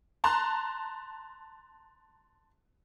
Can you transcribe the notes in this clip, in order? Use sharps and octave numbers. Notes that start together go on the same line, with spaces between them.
A5 A#5 C6 F#6